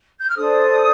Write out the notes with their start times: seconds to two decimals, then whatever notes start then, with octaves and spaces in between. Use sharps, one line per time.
0.19 G6
0.28 F6
0.36 D4 A4 C5 D#6